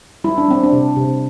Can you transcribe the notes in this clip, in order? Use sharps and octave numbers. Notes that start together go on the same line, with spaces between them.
G3 E4
D4
G3 C4
D4
C3
C3